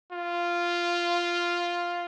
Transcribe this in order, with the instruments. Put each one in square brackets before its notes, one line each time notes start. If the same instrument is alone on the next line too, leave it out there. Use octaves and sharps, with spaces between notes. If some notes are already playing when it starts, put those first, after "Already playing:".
[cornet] F4